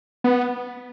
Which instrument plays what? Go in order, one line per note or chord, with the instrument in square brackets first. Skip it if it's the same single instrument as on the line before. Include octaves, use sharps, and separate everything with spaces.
[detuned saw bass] B3